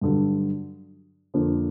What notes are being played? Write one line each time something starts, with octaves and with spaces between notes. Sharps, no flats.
G2 D3 F#3
F2 D3 F3 A#3 D4